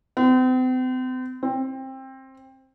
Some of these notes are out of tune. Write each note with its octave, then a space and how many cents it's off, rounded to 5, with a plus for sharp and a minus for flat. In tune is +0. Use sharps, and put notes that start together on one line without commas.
C4 -40
C4 +20